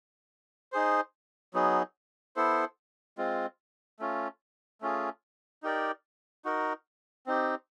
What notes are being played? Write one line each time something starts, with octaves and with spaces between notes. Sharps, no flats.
D#4 G#4 C5
F#3 B3 D#4 G#4
B3 E4 A4 C5
G#3 C4 F4
A3 C#4 F4
A3 C#4 F4 G#4
D#4 G4 A#4 D5
D#4 F#4 A#4
C4 D#4 G4